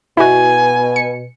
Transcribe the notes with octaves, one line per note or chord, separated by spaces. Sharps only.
B2 E4 F#4 G#5
C#7